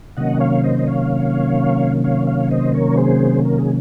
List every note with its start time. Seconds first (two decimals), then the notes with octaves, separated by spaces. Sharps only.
0.17 C3 D#3 F#3 A#3 C#4 D#5 F#5
0.40 C#5 F5
0.63 C5 D#5
0.79 D#5
0.87 C#5 F5
2.04 C#5 F5
2.27 C#5 F5
2.51 C5 D#5
2.74 A#4 C#5
2.97 G#4 C5
3.45 A#4
3.58 G#4